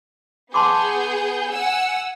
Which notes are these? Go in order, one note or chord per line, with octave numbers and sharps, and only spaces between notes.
B3 G#4 A5 C6 D6 G6
F#5 G#5 E6